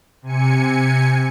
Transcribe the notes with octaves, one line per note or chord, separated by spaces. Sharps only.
C3 G#5 C#7